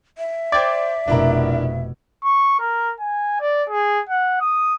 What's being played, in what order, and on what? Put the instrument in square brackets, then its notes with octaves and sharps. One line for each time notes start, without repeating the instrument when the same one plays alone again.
[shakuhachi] E5
[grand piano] C5 G5 G#6 [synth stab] D5
[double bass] F1 B2 [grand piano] D4 E4 A#4
[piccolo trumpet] C#6
A#4
G#5
D5
G#4
F#5
D#6